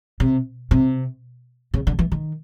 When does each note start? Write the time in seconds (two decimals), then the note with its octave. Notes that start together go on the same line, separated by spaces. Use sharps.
0.20 C3
0.71 C3
1.74 C#3
1.87 D3
1.99 E3
2.12 D#3